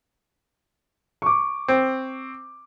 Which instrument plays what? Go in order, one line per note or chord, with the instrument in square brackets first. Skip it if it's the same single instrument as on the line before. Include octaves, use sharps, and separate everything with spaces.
[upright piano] C#6 D6
[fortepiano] C4